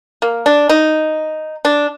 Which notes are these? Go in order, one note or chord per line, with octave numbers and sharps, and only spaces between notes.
A#3
D4
D#4
D4